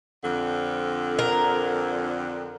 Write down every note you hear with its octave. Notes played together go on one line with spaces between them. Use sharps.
F2 D3
A#4